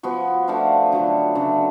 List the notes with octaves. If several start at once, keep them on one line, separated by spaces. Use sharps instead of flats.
F3 B3 F#4
F3 A3 D4 F4
D3 F#3 A3 F4
C#3 F#3 A3 D4